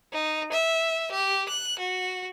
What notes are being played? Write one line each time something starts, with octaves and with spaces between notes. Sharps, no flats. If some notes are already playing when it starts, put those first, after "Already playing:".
D#4
E5
G4
F#6
F#4